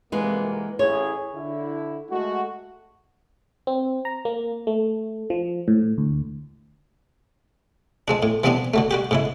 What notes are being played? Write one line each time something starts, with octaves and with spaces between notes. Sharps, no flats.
C2 F2 E3 G#3 A#3 B3
A1 E4 G#4 C#5
D3 E4
G#3 A3 F#4
C4
A#5
A#3
A3
F3
A2
D2
F3 G#3 D4
A2
E3 F3 G3 B3 C4 D4
D3 F#3 A3
G3 F#4 G4
G#2 C#3 E4